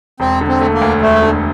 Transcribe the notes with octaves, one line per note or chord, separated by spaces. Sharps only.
E1 C4
D3
C4
A3
A#3
D2
E1 A3
D3